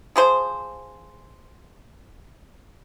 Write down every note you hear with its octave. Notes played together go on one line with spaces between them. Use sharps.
F3 G#4 C5